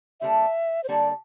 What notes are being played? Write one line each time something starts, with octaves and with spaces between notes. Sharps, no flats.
D3 G3 A#3 D4 A4 E5
C5
D3 G3 A#3 D4 A4 D5